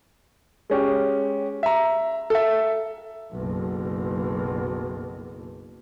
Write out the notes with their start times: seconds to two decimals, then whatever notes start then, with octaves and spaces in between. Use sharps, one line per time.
0.70 G#3 C#4 G4
1.63 E5 A#5
2.30 A4 E5
3.32 F#1 B1